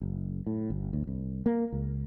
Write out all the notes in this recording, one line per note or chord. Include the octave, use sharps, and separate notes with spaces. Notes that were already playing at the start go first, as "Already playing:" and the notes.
F#1
A2
G1
D2
C2
A#3
C#2